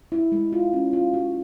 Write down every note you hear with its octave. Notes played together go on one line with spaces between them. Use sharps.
E4
G#3
F4
C#4
F4
F#4